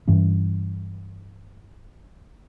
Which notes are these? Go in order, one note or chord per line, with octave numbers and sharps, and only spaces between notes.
G2 E3 C#4